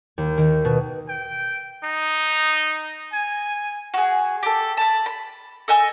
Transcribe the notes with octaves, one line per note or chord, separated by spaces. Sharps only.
D#2
D#3
B2
G5
D#4
G#5
F#4 G#4
G4 A4
A5 B5
B5
A4 D#5 G#5 E6